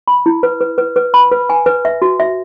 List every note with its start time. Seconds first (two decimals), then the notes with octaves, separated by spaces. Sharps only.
0.08 B5
0.26 E4
0.43 B4
0.61 B4
0.78 B4
0.96 B4
1.14 B5
1.32 B4
1.50 G#5
1.66 B4
1.85 E5
2.02 F#4
2.20 E5